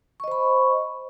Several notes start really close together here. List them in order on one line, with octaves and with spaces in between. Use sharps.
C#6 D#5 C5 B5